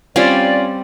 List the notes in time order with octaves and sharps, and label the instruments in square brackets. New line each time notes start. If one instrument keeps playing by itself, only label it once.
[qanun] G3 C4 [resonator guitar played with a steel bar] C#4 F4 [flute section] D5